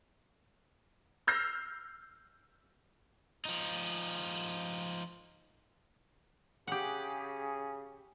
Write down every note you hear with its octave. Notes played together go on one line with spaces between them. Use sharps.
E6 F6 G6 A#6 C7
F3 D#4
C#3 G4 G#4 F#5